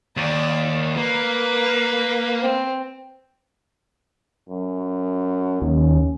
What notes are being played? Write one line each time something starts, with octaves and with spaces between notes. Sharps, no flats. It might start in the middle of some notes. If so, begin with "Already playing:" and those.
D#2 D5
A#3 B4
C4
F#2
D#2 C#4